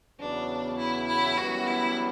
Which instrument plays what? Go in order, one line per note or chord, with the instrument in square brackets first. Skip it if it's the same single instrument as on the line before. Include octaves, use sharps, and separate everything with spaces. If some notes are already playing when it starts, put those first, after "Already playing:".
[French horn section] E2 C#3 F#3 B3 [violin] D4
[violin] E4
E4
[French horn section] F#2 E3 G3 B3 [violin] F#4
[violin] E4